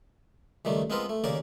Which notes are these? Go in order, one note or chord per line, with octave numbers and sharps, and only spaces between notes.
C#2 D#3 G3 A3
G#3 B3 C4 F4 A#4 B4
A3
D#2 C#3 A#3 A#4 D5